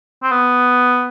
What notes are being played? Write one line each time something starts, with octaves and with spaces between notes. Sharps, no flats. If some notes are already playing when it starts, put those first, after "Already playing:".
C4
B3